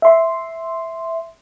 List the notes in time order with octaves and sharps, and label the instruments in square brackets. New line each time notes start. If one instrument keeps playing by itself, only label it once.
[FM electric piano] E5 C6